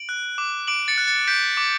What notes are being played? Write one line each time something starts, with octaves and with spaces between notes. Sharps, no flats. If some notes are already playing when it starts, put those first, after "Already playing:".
Already playing: D7 F#7
F#6
D6
D6 D7 F#7
A6 C#7
F#6
A6 C#7
G6 B6 D7
D6